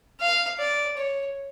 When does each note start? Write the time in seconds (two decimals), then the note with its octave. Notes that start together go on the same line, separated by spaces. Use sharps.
0.20 F5
0.59 D5
0.97 C#5